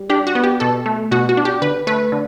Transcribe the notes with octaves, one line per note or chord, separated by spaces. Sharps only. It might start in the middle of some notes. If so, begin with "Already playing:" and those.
Already playing: G3
D4 G4
F#4
B3
G4
B2 A4
A3
B2 F#4
F#4
D4
G4
D3 B4
A3 B4
D3